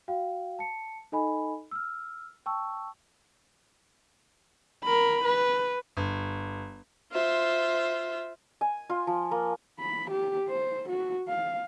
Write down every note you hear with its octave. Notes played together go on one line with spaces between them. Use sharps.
F#4 F5 G5
A5 C#7
D#4 A4 D#5 G#5 B5
E6 F6
G5 A5 C#6 E6
A#4 B5
B4
G1
F4 C5 E5
G#5
F4
F3
A#3
B5
G4
C5
F#4
F5